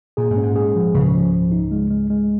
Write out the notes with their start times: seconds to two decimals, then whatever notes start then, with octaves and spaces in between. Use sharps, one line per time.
0.17 A#2 G#4
0.31 G#2
0.36 C#4
0.43 G#2
0.56 G#2 G#4
0.76 F3
0.95 C#2 A#2 C#3
1.14 F3
1.33 F3
1.52 D#4
1.72 G#3
1.90 G#3
2.10 G#3